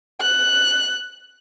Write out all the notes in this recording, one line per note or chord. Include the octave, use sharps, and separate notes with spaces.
F#6